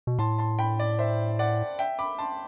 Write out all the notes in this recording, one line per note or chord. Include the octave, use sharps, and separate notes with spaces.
B2
A2 A5 C6
A5 C6
G5 B5
D5
C5 E5
D5 F#5
E5 G5
B5 D6
A5 C6